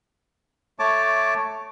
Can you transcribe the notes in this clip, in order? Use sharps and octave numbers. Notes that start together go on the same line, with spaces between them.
A3 C#5 A5 D6